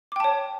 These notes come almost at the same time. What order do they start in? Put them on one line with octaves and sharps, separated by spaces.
D6 G5 A5 C#5